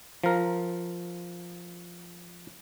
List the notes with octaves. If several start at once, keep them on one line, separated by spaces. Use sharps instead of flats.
F3 A#4